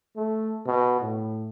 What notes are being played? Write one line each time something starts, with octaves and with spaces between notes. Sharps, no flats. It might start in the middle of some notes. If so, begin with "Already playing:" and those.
A3
B2
A2